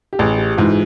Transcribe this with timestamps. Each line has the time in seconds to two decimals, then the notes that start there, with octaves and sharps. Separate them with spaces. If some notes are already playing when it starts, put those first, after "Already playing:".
0.13 G4
0.19 A1 G#4
0.38 G4
0.57 G#2 E3 F4
0.69 G#4